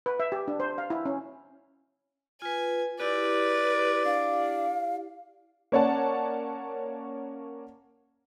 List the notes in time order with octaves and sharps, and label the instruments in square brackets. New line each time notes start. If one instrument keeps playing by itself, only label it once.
[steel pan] B4
E5
G4
D4
C5
F5
E4
C#4
[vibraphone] F4 B4 [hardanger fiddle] G#5
[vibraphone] E4 G4 [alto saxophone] B4 [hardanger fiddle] D5
[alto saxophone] D4 [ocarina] F5
[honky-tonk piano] A#3 C#4 C#5 D5 F#5 A5